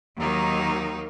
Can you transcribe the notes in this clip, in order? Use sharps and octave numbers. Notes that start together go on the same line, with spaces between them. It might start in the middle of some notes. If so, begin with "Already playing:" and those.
D#2 D#3 F#3 A#3 D#4